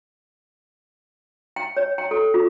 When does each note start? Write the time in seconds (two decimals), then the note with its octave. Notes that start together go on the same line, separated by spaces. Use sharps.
1.56 G5
1.77 C#5
1.98 G5
2.11 A4
2.34 F4